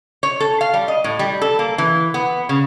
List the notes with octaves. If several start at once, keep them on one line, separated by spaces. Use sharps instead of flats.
C#5
A4
F5
G3
D#5
A2
G3
A4
A#3
E3
B3
C#3